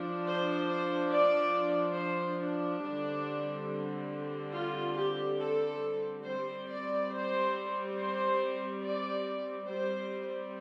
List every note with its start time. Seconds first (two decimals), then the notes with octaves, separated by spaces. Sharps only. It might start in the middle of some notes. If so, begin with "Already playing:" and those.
Already playing: F3 D4
0.26 C5
0.69 C5
1.12 D5
1.98 C5
2.41 D4
2.82 D3 G3 C4
4.54 F4
4.97 G4
5.40 A4
6.25 G3 C4 C5
6.68 D5
7.11 C5
7.96 C5
8.83 D5
9.68 G3 C4 C5